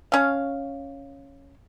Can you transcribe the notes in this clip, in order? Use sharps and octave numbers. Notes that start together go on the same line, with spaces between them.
C#4 F5